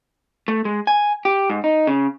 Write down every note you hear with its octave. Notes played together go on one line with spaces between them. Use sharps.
A3
G#3
G#5
G4
G#2
D#4
C#3